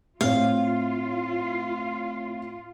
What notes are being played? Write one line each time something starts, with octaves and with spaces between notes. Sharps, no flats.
A2 C4 F4 C#5 F5